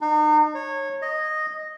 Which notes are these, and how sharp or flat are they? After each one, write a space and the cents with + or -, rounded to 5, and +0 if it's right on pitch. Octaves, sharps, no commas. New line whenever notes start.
D#4 -40
C#5 -20
D#5 -5